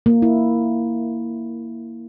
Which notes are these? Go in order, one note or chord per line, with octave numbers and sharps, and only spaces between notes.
A#3
E4